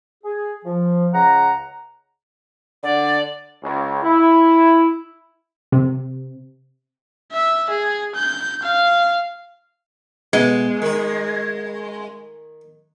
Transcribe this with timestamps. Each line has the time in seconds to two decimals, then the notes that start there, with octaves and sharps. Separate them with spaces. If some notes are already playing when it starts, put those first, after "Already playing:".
0.24 G#4
0.65 F3
1.14 C#2 C#3 D#5 F#5 A#5
2.83 D3 D5
3.63 C#2
4.03 E4
5.72 C3
7.32 E5
7.70 G#4
8.15 G6
8.63 F5
10.33 B2 G#3
10.82 D#3 D#4